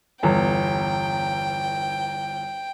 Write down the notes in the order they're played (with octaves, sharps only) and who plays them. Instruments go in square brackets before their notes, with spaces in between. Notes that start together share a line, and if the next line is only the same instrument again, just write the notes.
[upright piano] G1 E2 [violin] G5